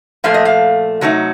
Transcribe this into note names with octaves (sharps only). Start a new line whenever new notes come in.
A#2 F3 A3 F5
D#5
F5
C3 F#3 A3 D#4